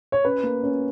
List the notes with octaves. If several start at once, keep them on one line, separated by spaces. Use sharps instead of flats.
C#5
C#4 B4
A#3
C#4